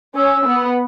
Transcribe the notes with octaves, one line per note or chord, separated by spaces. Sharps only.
C#4 E6
B3